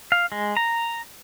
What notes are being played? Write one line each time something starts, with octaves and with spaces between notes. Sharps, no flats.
F5
G#3
A#5